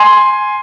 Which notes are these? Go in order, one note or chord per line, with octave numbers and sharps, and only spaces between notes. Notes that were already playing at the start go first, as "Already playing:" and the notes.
Already playing: G#5 C6